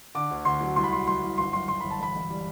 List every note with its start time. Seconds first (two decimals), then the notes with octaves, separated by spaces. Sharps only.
0.15 D3 D6
0.30 D2
0.45 D2 C6
0.61 F#3
0.76 C2 C6
0.84 B5
0.92 F#3 C6
1.07 C2 C6
1.23 C2
1.38 G1 C6
1.53 F#2 C6
1.68 F#2 C6
1.80 G1 B5
1.91 A5
1.99 E1 B5
2.16 E1
2.30 G3